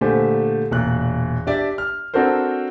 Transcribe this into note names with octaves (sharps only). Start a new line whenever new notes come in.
A#2 D3 A3 G4 C5 G#5
E1 A#2 F#6
D4 G4 D5 E5
F6
C4 D4 F#4 A4 A#4 C5